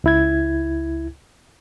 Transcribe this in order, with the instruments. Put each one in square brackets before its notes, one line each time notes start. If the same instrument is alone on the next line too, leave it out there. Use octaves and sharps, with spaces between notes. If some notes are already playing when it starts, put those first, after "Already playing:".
[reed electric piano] C#2 E4 G#6